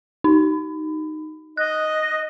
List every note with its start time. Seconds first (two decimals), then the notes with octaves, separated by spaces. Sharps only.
0.24 D#4
1.57 D#5 F#6